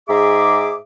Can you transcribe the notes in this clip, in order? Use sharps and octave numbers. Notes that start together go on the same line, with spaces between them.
G#2 G#4 E5 D6